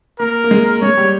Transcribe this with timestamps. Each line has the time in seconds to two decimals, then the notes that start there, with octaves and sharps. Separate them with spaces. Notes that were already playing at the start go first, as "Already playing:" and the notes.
0.20 A#3 A#4
0.44 A#3
0.51 G#3
0.81 G#3 C#5
0.98 G3